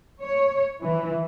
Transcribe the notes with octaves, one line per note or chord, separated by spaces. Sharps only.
C#5
E3